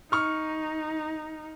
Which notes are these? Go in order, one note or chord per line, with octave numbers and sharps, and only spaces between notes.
D#4 C#6 F6